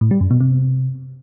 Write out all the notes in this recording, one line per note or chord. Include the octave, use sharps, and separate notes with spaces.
A2
G3
F#2
B2
C3